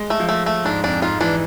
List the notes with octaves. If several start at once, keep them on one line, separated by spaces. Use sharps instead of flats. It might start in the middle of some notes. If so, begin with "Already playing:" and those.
Already playing: G#3
A3
F3
A3
A3
G#2 D4
F2 D4
G#2 F4
E3 D4